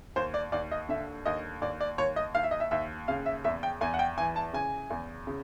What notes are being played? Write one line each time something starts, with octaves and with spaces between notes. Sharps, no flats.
D#2 C5
D5
D#2 D5
D#5
D3 E5
D#2 D#5
D#2 D5
D5
D#2 C#5
D#5
D#2 F5
E5
D#5
E5
D#2 E5
C#3 F5
E5
E2 E5
G5
E2 G#5
F#5
G5
E3 G#5
A5
C#3 G#5
E2
C#3